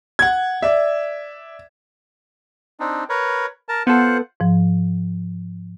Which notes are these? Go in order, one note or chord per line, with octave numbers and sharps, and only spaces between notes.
F#5 G#6
D5 E5
C4 D4 D#4
A#4 B4 C#5
A#4 A5
B3 F4 A4 C5 F#5
G#2 F3